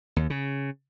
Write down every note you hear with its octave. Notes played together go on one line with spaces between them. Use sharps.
D#2
C#3